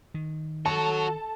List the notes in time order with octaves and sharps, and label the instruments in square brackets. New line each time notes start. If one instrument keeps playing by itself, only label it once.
[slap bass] D#3
[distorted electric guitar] F#4 C#5 [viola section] A4 [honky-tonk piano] A5